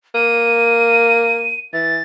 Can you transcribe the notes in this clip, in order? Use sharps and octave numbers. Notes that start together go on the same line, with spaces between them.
A#3 D#7
E3 A6